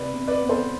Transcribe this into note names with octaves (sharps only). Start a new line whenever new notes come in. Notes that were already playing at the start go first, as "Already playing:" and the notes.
Already playing: C3 B4 D5
C3
B4 D5
B3
A4 C5